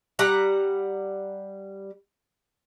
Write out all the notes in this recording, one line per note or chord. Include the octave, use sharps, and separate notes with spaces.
G3 F#5 A#5